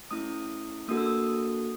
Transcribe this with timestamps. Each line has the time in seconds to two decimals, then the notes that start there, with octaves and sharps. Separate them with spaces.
0.11 A3 C#4 E4 D#6
0.88 A#3 D4 F#4 A4 D#6
0.97 E6
1.06 D#6